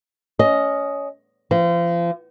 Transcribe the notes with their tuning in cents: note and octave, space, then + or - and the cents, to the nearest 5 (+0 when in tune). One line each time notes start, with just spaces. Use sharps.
C#4 +20 D#5 +0
F3 -35 C4 -35